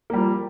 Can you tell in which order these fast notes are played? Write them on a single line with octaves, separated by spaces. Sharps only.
A#3 G3 F3